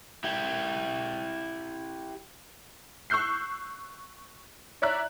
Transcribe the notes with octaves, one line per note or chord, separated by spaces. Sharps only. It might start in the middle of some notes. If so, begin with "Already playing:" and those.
E4 G4
C#6 E6 F#6 G6 C7
C#5 D5 E5 A#5 F#6